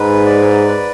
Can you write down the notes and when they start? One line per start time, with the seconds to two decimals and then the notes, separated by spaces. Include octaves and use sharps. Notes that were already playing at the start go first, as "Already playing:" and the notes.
Already playing: G#2 B4
0.26 D5
0.68 B4